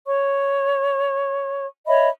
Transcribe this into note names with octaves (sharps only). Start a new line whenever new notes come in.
C#5 C#6
C#5 D#5 E5 B5